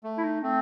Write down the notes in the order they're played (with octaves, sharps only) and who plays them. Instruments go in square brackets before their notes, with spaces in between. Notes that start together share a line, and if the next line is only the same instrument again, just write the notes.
[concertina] A3
[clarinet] E4
D#4
[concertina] A3 [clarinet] C4